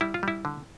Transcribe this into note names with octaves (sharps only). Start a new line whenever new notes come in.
G3 E4
F4
G3 E4
D3